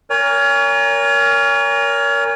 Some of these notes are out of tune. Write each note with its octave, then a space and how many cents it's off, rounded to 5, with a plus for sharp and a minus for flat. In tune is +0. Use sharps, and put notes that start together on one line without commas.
A#4 +0 C#5 +35 G#5 -30